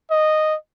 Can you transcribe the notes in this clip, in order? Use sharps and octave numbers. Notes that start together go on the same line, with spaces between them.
D#5